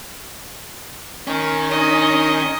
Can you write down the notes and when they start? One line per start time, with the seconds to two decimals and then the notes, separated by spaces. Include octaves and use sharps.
1.27 D#3 C#4
1.71 D4 D#4 D#5